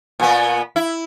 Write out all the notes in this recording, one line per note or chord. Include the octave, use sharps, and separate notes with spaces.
A#2 B3
E4